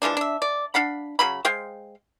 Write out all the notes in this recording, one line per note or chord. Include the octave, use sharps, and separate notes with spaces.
E3 F3 G#3 D4
D4 E5
D5
D4 F5 F#5 B5
C#3 F#3 B5
G#3 C5 F5 G5